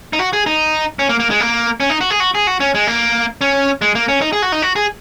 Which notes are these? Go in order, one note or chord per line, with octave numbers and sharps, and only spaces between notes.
D#4
F#4
G#4
D#4
C#4
A#3
A#3
G#3
A#3
C#4
D#4
F#4
G#4
F#4
G#4
F#4
C#4
G#3
A#3
C#4
G#3
A#3
C#4
D#4
G#4
F#4
D#4
F#4
G#4